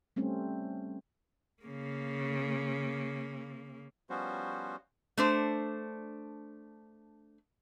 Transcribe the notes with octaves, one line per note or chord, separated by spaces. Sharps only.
G3 A3 C4 C#4
C#3 A#3
F3 G3 B3 C#4 F#4 C5
A3 D4 C5